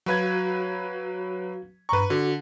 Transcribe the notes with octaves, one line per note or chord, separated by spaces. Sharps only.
F#3 F#4 B4 F5 G#6
G2 B4 A#5 C#6
D3 F#4